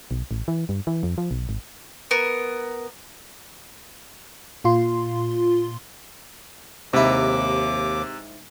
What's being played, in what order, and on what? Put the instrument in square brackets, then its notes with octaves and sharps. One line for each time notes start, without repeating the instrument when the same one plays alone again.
[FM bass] B1
A1
E3
G2
E3
F2
F3
B1
G#1
[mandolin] B3 A#4
[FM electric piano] A#2 F4 C6
[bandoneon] D#2 D6 [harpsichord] G#2 E4 [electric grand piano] C3